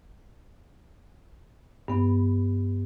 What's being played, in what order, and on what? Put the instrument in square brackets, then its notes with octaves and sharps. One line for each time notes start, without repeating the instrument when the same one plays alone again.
[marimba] G2 B3